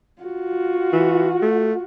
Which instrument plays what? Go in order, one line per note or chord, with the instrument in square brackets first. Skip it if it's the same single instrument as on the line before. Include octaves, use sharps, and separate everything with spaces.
[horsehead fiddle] F4 F#4
[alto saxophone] E3
A3